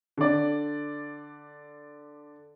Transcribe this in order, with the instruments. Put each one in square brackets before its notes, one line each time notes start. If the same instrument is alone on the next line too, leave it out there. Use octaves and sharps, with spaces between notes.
[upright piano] D3 D5